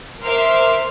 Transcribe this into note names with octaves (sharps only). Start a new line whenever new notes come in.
A#4 C5 E5 C6 D6 F6